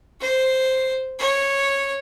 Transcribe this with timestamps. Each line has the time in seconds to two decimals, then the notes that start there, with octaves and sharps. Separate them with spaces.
0.21 C5
1.19 C#5